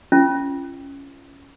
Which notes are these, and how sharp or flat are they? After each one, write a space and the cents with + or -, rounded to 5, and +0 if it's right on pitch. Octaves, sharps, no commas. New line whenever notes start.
C#4 +0 F4 -40